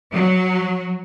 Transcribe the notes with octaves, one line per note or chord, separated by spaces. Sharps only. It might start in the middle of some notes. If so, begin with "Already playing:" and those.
F#3